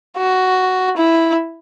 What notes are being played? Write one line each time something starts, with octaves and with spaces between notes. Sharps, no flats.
F#4
E4